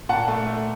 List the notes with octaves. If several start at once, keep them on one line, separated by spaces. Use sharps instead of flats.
A#2 F#5 A5
A3
A3